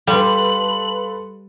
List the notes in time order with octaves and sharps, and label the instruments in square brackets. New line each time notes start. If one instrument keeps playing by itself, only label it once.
[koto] G3 [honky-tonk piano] A4 B4 [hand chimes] F5 C6 [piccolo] F#7